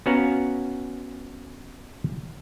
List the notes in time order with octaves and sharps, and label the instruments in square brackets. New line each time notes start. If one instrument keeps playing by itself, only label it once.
[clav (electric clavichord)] B3 C#4 F#4 F5 A#5